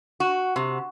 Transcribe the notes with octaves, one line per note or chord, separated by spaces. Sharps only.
F#4
C3